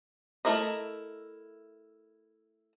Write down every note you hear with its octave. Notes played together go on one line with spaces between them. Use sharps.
A3 A#3 E4 A#4 D#5